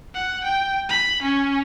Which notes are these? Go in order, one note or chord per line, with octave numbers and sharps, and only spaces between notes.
F#5
G5
B5
C#4